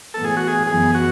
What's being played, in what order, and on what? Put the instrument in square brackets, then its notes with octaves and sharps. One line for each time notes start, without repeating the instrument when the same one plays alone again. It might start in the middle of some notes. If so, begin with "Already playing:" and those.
[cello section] A2 E3 B3 [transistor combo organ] A4
[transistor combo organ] G#4
F#4
G#4
[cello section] F#2 E3 B3 [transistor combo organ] G#4
[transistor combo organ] F#4